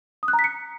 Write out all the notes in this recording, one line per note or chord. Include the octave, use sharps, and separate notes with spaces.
D#6
F#6
A#5
B6
C#7